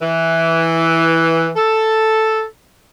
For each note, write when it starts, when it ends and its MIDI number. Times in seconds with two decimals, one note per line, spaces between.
0.01 1.50 52
1.56 2.44 69